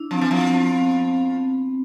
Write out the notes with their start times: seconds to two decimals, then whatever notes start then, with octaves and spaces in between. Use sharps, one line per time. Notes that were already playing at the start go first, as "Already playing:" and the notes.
Already playing: D4 E4
0.11 F3 C4
0.21 E3
0.31 F3 B3
0.51 C4
0.71 B3